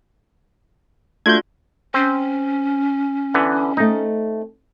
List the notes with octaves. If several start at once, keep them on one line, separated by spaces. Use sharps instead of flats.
A3 D4 F4 F#4 G6 G#6
C4 C#4
D3 E3 B3
A3 C4 D#4